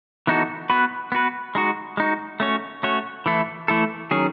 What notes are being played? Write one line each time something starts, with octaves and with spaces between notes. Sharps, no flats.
E3 B3 D#4 F#4 A4
B3 F#4 B4
B3 F#4 B4
G#3 D#4 F#4
G#3 D#4 F#4
A3 C#4 F#4 C#5
A3 C#4 F#4 C#5
E3 A3 E4 A4
E3 A3 E4 A4
D#3 F#3 C#4 G#4